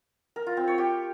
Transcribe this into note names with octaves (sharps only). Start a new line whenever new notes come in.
A#4
F4
C4
C#5
G4